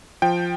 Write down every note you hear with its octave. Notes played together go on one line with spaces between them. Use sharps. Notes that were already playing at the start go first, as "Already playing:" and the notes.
F3 G5